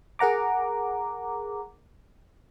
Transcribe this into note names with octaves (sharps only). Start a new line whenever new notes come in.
G#4 A#4 F#5 A#5 D6